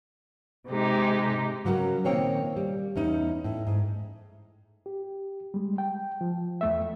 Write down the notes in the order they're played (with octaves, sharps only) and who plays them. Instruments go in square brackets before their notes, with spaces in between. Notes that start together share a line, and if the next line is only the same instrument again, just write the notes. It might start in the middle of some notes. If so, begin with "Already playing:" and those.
[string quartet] C3 G#3 D#4 G4
[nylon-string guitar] C#3 F#3 C#4 F#4 A#4
A#2 D#3 A#3 C4 C#5 G5
G3
E2 C#4 D#4
A2
G#2
[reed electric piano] G4
G3 G#3
G5
F3
E2 A3 E5